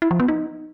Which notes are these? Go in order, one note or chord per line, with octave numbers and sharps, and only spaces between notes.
E4
F3
B3
D#4